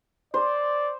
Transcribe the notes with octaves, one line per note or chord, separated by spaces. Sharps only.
C5 D5